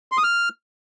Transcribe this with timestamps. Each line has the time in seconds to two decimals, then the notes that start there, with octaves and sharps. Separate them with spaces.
0.12 C6
0.18 D#6
0.24 F6